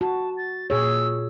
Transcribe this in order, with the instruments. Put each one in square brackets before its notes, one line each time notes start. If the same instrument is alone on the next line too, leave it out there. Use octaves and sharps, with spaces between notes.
[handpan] F#4 [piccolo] A5
[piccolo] A6
[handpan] A#2 G#4 C#5 [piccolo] E6